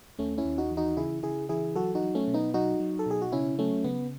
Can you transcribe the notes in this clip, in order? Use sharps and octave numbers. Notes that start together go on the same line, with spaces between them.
D#2 A3 C#4
C#4 E4
D#2
D#4 F#4
E3
D#4 F#4
C#3 E4 G#4
C#3 E4 G#4
E3 E4 G#4
F#3 F#4 A4
D#4 F#4
F#3
A3 C#4
B2
B3 D#4
F#3 D#4 F#4
F#3
A4
B2 G#4
F#4
C#3 C#4 E4
F#3 A3 C#4
C#3 B3